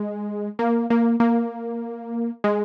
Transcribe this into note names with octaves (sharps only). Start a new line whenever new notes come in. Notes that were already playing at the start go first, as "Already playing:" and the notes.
Already playing: G#3
A#3
A#3
A#3
G#3